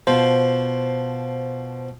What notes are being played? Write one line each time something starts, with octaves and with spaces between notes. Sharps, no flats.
B2 F3 C5